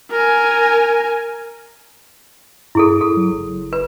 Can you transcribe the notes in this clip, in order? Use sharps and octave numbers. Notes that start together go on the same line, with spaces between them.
A#4 G#5
G2 E4 G#4 A4
A4
F#3
F#1
B4